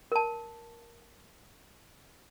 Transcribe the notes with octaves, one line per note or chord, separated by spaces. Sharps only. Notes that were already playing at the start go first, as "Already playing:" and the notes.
A#4 A5